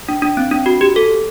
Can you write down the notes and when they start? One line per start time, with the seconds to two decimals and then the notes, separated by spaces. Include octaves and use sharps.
0.08 D4
0.22 D4
0.37 C4
0.51 D4
0.66 F#4
0.81 G4
0.96 A4